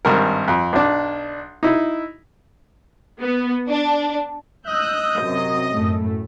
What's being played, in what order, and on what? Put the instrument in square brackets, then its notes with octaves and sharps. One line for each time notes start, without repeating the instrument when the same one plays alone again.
[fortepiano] G#1 G2 A#4
F2
B1 D4
D#4 E4
[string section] B3
D4
[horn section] D#5 [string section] E6 F#6 G6
[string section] F#2 C3
F#2 A2 A3